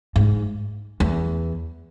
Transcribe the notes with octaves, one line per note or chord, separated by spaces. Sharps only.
G#2
E2